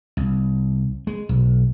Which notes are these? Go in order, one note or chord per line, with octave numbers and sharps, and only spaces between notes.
C2
G#3
B1